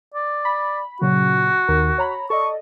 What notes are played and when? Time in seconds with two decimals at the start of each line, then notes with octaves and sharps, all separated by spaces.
0.15 D5
0.45 B5
1.01 A#2 C#3 F#3 F#4
1.68 D#2 A#4
1.98 C#5 A#5 B5
2.30 A4 D5 D#5 C#6